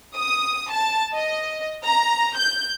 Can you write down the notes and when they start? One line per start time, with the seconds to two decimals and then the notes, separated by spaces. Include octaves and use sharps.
0.16 D#6
0.72 A5
1.14 D#5
1.85 A#5
2.37 G6